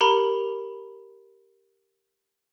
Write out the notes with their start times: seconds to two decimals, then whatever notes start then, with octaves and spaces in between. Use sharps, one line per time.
0.01 G4 A#4 A#5 B5